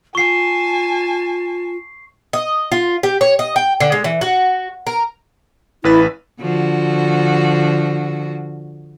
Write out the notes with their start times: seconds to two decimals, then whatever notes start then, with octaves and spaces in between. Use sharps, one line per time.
0.15 F4 G#5 A5 C#6 C7
2.33 D#5
2.72 F4
3.03 G4
3.21 C#5
3.39 D#5
3.56 G5
3.80 D3
3.92 G#3
4.04 E3
4.21 F#4
4.87 A#4
5.84 A1 E4 B4 A6
6.41 D3 F3 F#4